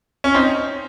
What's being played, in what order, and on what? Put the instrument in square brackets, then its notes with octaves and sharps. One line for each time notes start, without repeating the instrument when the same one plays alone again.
[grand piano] C#4
C4 D#4